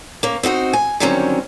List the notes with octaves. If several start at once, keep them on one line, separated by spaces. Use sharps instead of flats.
A#3 C#4
C4 D#4 F#4 D#5
G#5
D3 D#3 F#3 G3 C4 C#4